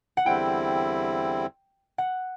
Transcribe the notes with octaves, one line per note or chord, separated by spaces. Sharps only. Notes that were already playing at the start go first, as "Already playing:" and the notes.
F#5
E2 D3 G3 C4 E4 G5
F#5